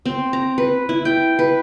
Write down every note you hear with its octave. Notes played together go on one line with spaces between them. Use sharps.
C4
A#5
B4
E4
G5
B4